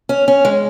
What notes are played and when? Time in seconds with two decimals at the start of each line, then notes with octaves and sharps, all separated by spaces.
0.09 C#4
0.28 C#4
0.45 G#3